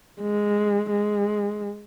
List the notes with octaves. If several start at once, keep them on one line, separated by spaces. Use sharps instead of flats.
G#3
G#3